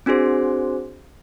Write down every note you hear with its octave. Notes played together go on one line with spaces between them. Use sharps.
C4 D4 F#4 G#4 C5